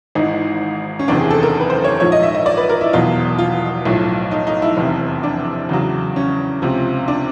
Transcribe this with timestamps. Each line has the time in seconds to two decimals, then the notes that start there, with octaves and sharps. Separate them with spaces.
0.15 G#1 G#2 E3 D#4
0.99 C#4
1.08 F#1 E2 C3 D#3 D4
1.20 G#4
1.30 A4
1.43 A#4
1.60 B4
1.70 C5
1.84 C#5
2.00 A#1 G#2 F3 C#5
2.12 D#5
2.23 E5
2.35 D#5
2.46 D5
2.57 B4
2.69 A#4
2.81 E4
2.93 F1 E2 B2 F#3 F4
3.38 F4
3.85 B1 A2 F3
4.31 D#4
4.47 D#4
4.62 E4
4.77 F1 E2 C3
5.23 D4
5.69 E2 C#3 F#3
6.16 C#4
6.62 C#2 C3 F3
7.08 D4